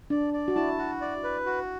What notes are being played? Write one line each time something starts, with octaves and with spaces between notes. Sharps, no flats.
D4 D5
D5
F#4
E4 A5
F#4
D5
B4
F#4